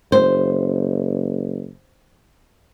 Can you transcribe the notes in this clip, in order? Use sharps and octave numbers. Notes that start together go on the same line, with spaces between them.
F#1 C5